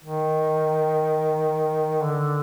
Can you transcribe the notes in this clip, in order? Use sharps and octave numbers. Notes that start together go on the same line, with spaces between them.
D#3
D3